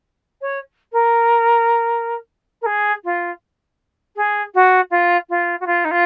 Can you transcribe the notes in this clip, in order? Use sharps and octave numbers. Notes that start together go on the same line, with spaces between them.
C#5
A#4
A#4
G#4
F4
G#4
F#4
F4
F4
F#4
F4
D#4
F4